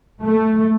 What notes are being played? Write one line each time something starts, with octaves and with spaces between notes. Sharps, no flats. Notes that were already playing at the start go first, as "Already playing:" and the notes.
A3